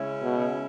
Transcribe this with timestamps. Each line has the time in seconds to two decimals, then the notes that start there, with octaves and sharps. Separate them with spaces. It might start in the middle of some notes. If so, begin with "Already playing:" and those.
Already playing: C#3 G#3 C#4 E4
0.23 B2